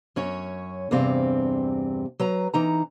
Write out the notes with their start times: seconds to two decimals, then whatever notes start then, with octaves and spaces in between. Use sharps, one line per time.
0.16 F#2 C#4 C#5
0.91 E2 G2 C3 C4 F5
2.20 F#3 B4 A#5
2.54 E3 D#4 A#5